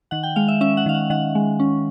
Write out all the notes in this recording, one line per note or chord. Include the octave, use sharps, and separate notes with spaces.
D#3 F#5
G5
G#3 F5
E5
C#4 E5
F#5
D#3 F5
F#5
D#3 F#5
G#3
C#4